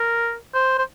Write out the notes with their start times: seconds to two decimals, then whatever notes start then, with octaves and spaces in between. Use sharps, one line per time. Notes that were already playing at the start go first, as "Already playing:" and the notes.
Already playing: A#4
0.54 C5
0.78 C5